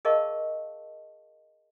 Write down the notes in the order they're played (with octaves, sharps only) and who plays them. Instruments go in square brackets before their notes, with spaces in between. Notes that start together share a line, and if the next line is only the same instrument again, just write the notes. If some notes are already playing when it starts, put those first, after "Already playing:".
[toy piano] G#4 A#4 D#5 F5 A5 C#6